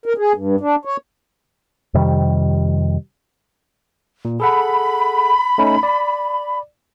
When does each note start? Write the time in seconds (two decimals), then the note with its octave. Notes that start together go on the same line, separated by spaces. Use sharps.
0.06 A#4
0.18 G#4
0.35 G2
0.60 D4
0.85 C#5
1.94 F2 C3 D#3 G3
4.25 A#2
4.40 G#4 A4 F#5 B5
5.58 A3 C#4 D#4
5.83 D5